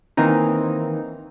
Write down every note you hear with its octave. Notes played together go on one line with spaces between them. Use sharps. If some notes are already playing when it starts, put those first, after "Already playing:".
D#3 E3 A#3 C4 D#4